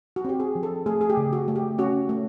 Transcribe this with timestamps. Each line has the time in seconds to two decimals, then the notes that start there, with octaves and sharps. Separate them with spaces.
0.16 F#4
0.25 C4 G4
0.40 G#4
0.55 F3
0.63 A4
0.86 A3 G#4
1.01 G#4
1.10 G4
1.17 C#3
1.33 F#4
1.48 A3
1.56 G4
1.78 C#4 F#4
2.09 A3